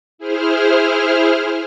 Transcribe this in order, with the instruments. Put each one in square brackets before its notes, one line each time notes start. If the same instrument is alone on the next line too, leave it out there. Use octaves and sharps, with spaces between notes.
[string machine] E4 G#4 C5 F6